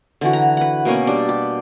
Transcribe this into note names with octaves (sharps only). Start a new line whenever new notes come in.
D3 E3 F#4
A#5
B4 F#5
B2 A#3 C#4 C#6
G3 D4
G4